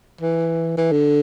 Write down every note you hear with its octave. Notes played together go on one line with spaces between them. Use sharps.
E3
E3
D3